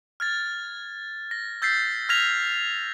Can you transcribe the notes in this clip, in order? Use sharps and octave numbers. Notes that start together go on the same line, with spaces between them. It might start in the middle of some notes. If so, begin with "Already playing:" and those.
F6 G#6 A6
A#6
E6 G6 A6 B6 C7
F6 G#6 A#6 B6 F7